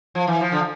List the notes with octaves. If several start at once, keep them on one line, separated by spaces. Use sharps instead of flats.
F3
E3
F3
D3